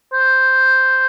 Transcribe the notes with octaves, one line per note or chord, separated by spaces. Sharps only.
C5